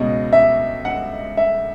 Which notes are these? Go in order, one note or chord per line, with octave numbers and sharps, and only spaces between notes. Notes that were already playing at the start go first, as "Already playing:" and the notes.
Already playing: C#2 B2 D#5
E5
F#5
E5